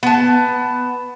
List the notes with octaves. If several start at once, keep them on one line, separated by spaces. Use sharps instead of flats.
B3 A5